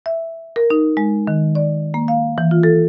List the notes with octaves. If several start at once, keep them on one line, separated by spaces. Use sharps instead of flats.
E5
A#4
D#4
G#3
D#3
D5
A#3
F5
E3
F4
A4